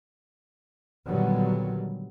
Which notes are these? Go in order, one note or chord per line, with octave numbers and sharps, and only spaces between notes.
A#2 D3 D#3 F#3 G3 B3